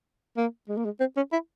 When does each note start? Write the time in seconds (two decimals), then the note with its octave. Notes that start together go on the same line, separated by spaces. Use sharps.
0.37 A#3
0.69 G#3
0.77 A#3
0.85 G#3
1.00 C4
1.17 C#4
1.33 E4